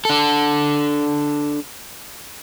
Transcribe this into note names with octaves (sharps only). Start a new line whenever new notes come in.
D4 A4